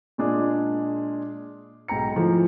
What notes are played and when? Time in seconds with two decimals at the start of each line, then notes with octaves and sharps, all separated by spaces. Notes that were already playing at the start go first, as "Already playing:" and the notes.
0.18 A#2 G#3 D4 G#4
1.88 B1 G#2 G5 A#5 C#7
2.15 E3 F3 A3